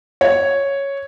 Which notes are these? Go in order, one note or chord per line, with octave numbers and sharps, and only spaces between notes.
C#5